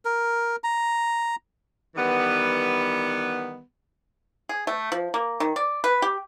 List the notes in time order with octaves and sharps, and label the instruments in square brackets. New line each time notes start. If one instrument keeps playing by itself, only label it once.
[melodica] A#4
A#5
[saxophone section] D#3 E3 G3 B3
[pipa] G#4
A3
F3
A#3
D#3
D5
B4
G4